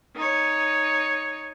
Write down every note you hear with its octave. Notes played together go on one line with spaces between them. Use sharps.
D#4 C#5